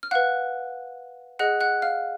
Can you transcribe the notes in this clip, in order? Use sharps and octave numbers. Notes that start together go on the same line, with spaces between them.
F6
B4 F5 F#5 F#6
G#4 D#5 F#5 F#6
F#5 F#6
F5 F6